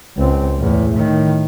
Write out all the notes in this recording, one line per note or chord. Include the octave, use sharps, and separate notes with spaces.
C#2 C4
E2 A2
A2 D#3